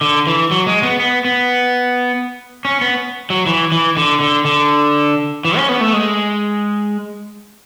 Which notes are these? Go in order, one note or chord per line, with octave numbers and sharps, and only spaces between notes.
D3
E3
F#3
G#3
B3
B3
B3
C#4
B3
F#3
E3
E3
D3
D3
D3
E3
C#4
B3
A3
G#3